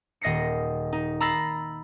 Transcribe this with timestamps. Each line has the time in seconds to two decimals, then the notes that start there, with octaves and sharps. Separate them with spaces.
0.21 D#1 D#5 A#6 C7 C#7
0.93 D#4
1.20 A#5 B5 E6 A6 A#6 C7